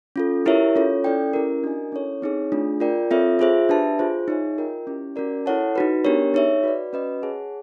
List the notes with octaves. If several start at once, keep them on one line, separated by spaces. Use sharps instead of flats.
C#4 F4 A4
E4 G4 A#4 C#5 E5
C#4 F4 A4 C#5
C#4 E4 A4 D5 G5
C#4 E4 G4 A#4
D4 F#4 A#4 D#5 G#5
C#4 E4 A4 C#5
C4 D#4 G#4 C#5
A3 D4 F4 G#4
F4 A#4 D5 G5
C4 F4 A4 C#5 E5
F4 G#4 C5 E5
D4 G4 B4 E5 A5
F4 G#4 C5
D#4 G#4 C#5 E5 G#5
F4 A#4 D#5 G5
C#4 E4 G4
C#4 F#4 A#4 D5
E4 A4 C#5 F#5 A5
D#4 F#4 B4
B3 D4 G4 A#4 C#5
D#4 G#4 C#5 E5
F#4 B4 D5
C#4 F#4 B4 D#5
G#4 C#5 F#5 A5